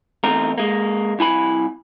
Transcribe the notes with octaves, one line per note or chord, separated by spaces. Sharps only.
E2 A3 C4 D#4 A#4
G#3 A#3
C2 E4 G#5 B5